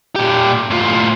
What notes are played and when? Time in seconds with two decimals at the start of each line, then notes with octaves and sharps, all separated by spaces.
0.16 A#2 G4
0.71 A2 F4